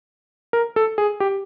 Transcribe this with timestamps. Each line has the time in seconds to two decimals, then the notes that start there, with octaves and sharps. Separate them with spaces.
0.53 A#4
0.76 A4
0.98 G#4
1.20 G4